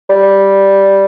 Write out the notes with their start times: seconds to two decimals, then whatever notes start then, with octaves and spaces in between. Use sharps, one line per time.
0.10 G3